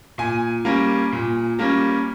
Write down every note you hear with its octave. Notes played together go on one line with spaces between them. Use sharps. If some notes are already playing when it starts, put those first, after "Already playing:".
A#2 G#5
G3 A#3 C#4
A#2
G3 A#3 C#4